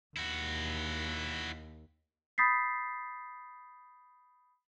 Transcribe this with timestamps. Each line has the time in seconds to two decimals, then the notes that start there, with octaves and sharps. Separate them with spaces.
0.17 D#2 E4 F#4
2.38 B5 D#6 G6 A6 B6 C7